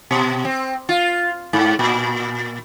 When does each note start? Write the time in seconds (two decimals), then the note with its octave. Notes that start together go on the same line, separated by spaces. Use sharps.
0.11 B2
0.45 C4
0.89 F4
1.53 G#2
1.79 A#2